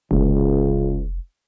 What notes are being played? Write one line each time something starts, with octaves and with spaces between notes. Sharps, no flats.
F1 C#2